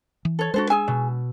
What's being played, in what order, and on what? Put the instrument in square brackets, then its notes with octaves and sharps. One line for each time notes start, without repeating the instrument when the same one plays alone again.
[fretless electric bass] E3
[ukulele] A4 C#5
[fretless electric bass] G#3 D4 [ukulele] F#4 A4 C5
[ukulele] G#4 G#5 [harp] E6
[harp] B2